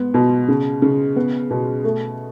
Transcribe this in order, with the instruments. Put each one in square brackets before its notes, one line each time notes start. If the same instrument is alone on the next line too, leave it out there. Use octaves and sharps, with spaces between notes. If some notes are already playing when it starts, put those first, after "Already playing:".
Already playing: [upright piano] G#2 B3
B2
C#3
C#3
B3
B2
A3